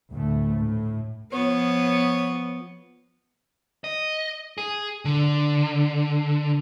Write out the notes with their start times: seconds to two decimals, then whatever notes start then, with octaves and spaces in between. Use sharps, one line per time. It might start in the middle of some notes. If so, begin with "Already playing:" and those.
0.11 D2 A2 A3
0.58 A2
1.32 F3 B3 C#5
3.84 D#5
4.58 G#4
5.05 D3